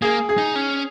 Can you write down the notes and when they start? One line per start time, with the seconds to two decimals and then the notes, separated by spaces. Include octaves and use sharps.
0.02 A#3 G#4
0.29 G#4
0.38 D#4
0.56 C#4